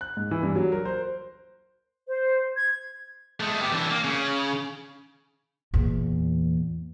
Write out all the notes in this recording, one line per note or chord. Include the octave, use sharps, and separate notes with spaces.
F#6
G#2
E3
G2
F#3
A#4
C5
C5
G#6
G#3 A3
B3 G4
E3 D4
A#3
C#3
E2 A#2